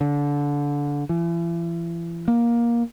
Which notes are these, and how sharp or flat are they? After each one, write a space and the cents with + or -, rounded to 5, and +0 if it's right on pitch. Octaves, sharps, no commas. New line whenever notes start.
D3 -25
E3 +40
A#3 +15